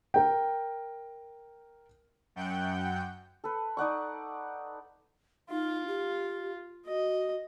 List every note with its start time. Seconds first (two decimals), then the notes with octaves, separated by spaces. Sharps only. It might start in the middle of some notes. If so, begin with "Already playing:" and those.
0.14 A#4 G5
2.36 F#2 F#5 G5 G6
3.44 A4 B4
3.77 D#4 D5 F#5 C#6
5.50 D#4 F4
5.88 G4
6.87 F#4 D#5